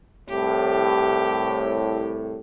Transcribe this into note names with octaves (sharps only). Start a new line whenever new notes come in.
C2 A2 G4